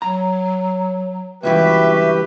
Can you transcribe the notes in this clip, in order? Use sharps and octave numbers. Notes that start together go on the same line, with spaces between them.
F#3 A#5
C#2 G2 E3 F#4 G4 B4 E5